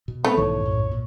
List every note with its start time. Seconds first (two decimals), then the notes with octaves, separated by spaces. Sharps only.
0.08 B2
0.25 G#3 A3 B3 C4
0.37 B1 G#2 B2 D#3 E3 C#5
0.62 F#2 A2
0.91 A#2